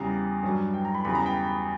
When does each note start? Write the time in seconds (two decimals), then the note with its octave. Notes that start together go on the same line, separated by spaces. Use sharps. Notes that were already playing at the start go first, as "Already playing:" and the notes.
Already playing: E2 C#3 G3 A#5
0.43 G2 F#3
0.74 G5
0.85 A#5
0.95 B5
1.05 E2 C#3 G3 B5
1.15 A#5
1.26 G5